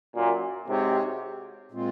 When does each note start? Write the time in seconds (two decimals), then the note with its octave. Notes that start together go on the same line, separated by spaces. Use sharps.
0.15 F#2 A#2
0.68 G#2 C3 G#3 C4 F#4 C#5
1.71 A#2 G#3 C4 F4